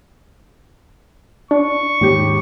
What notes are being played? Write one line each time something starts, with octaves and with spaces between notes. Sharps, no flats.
D4 C#6
D#2 G#2 G4